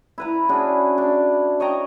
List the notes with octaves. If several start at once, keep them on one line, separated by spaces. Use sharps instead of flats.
E4 B4 A#5
C#4 D4 F#4 G#4
D4
C#5 D#5 G5 A#5